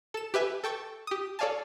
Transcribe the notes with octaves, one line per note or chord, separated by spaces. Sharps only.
A4 E7
G4 B4 E5 G#5
A4 G5 C#6 A6
G4 D#6
A4 C#5 D5 F5 G#5 A5